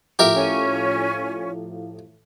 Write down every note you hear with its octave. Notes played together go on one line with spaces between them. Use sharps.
A2 F3 G4 A#4 E5
C#4